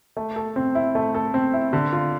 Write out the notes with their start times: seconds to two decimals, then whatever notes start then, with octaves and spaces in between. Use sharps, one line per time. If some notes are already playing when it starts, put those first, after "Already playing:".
0.17 A3
0.36 A4
0.56 C4
0.75 E4
0.95 A3
1.14 A4
1.34 C4
1.53 E4
1.73 D3
1.92 F4